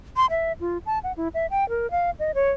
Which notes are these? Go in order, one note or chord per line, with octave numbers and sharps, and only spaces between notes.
C6
E5
F4
A5
F#5
E4
E5
G5
A#4
F5
D#5
C#5